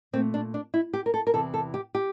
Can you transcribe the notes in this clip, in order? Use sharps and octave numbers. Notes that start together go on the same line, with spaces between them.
A#2 A3 C4
D4
D4
E4
G4
A#4
A4
A#4
E2 C3 E3 A4
A4
G4
G4